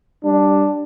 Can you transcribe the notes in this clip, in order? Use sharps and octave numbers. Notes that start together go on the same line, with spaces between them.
G3 D4